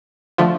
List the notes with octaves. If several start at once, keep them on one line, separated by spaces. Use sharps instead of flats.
D3 F3 A3